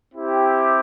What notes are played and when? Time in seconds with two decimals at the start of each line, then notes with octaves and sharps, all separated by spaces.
0.14 C4 E4 G4